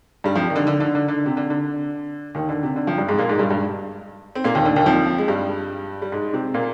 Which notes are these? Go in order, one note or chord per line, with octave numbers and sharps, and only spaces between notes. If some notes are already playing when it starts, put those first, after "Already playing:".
G2 G3
F2 F3
D#3
D3
D3
D3
D3
D3
C3
D3
D3
D#2 D#3
D3
C3
D3
F2 F3
G2 G3
G#2 G#3
A#2 A#3
G#2 G#3
G2 G3
G2 G3
C4
A#2 A#3
D#2 D#3
D3
D#2 D#3
F2 F3
G#3
G2 G3
G3
G#2 G#3
C3 C4
A#2 A#3